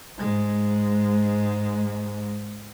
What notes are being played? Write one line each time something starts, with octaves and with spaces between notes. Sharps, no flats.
G#2 G#3